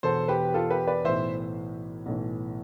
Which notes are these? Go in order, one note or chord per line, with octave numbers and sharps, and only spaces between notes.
E1 E2 B2 A4 C5
G4 B4
F4 A4
G4 B4
B4 D5
B1 A2 E3 C5 E5
B1 A2 E3